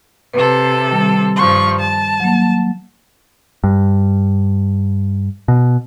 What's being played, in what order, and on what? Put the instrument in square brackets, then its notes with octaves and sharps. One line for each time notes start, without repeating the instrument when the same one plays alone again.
[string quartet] C3 A4 [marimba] B4
[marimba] D#3 G3
[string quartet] G2 F3 C#6
A5
[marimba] F#3 A#3
[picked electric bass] G2
B2